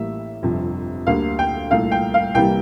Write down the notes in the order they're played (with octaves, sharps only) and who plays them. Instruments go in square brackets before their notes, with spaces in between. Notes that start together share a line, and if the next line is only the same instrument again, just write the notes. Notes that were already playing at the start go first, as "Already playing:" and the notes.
Already playing: [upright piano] A1 A2 G3 A#3 E5
G1 F2 C3
D2 D3 G3 A#3 F5
G5
C2 A#2 A3 F5
G5
F5
C2 C3 E3 G3 A#3 G5